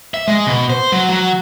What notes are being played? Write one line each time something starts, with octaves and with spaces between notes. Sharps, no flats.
E5
G#3
B2
C5
F#3
F#3